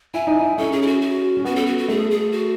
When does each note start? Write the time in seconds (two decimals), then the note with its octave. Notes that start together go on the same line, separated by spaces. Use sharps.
0.14 E4 G#5
0.27 D#4
0.39 E4
0.58 C#4 A4
0.72 G#4
0.82 E4
0.86 F#4
1.01 F#4
1.37 C#4
1.44 B3 F#4
1.56 A4
1.67 F#4
1.78 F#4
1.88 A3 G#4
2.11 G#4
2.32 F#4